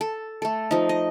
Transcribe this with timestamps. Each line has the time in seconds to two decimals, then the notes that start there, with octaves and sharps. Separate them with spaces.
0.01 A4
0.42 A3 A4
0.71 F3 D#4
0.89 D#5